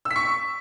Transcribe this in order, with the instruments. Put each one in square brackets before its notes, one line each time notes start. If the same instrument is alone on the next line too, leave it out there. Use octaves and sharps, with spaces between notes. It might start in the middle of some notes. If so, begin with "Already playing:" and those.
[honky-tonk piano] E6
B6
C#6